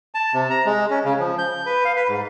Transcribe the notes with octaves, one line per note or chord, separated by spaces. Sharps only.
A5
C3
A#5
G#3
C#4
C#3
F3
G6
B4
F5
B4
G#2